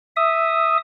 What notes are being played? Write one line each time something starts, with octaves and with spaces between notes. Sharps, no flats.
E5 D#6